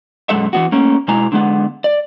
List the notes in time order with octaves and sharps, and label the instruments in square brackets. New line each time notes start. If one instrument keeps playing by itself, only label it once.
[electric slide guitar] F#2 B2 G#3 A4 E5
E3 B3 F#4
A3 A#3 C#4
B2 G#3 E4 G#5 A#5
D3 G#3 B3
D5